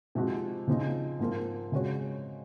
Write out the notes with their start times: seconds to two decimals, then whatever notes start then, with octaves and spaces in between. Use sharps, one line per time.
0.15 C3 F3 G#3 D#4 F#4
0.67 C#3 F3 C4 D#4
1.19 G#2 F3 C4 F4 A#4
1.72 C#3 G#3 C4 F#4 C#5